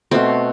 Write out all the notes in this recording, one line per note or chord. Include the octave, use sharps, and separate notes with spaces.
B2 A3 C4